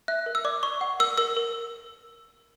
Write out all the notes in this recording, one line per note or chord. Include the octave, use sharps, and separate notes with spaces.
E5 F#6
A#4
E6
D5 D6
D5 C#6
F#5
A#4 E6
A#4 E6
A#4